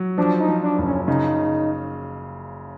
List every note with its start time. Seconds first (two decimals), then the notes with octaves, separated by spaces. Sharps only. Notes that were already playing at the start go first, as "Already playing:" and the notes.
Already playing: F#3
0.18 F3 D4
0.40 D#4
0.48 F3
0.63 D4
0.78 F#1
0.85 C#4
1.08 C#3 D#4